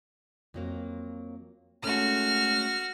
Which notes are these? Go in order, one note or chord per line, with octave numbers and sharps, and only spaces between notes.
F2 F#3 A#3
G#3 A3 C#4 F#4 F6